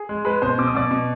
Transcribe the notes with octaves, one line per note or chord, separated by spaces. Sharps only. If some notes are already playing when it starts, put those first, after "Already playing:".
Already playing: G#4
G#3
G#3 B4 B5
B2 C5 C6
B2 D6
D#6
B2 D5 D6
B2